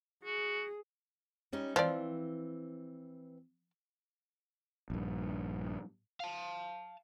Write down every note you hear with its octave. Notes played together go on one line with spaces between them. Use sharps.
F#4 G#4
G3 C#4 D#4
E3 F3 C4 D5
A#1 G2
F5 A5